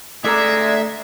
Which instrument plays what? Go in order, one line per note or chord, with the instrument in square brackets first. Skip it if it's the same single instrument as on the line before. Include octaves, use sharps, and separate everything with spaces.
[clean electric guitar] D2 A4 A#5 [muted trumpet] G#3 [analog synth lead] D5 [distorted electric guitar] E5